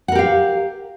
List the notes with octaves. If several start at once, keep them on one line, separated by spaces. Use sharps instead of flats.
G4 A#4 F5 F#5